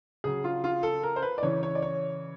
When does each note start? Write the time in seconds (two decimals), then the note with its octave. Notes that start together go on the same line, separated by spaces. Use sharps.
0.24 C#3 F#3 G#4
0.44 F4
0.64 F4
0.83 A4
1.03 A#4
1.16 C5
1.22 B4
1.38 D5
1.42 C#3 E3 C#5
1.63 C#5
1.75 D5
1.82 C#5